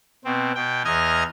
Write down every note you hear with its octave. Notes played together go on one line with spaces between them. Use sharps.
B2 C4
B2 G5
E2 D#5 F6 G#6